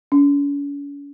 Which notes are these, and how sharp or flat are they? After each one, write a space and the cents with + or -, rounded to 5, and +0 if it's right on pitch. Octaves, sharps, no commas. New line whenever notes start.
C#4 +40